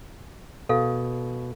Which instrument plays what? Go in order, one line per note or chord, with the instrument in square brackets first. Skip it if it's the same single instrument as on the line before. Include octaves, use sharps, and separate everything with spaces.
[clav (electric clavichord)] B2 [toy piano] A4 F5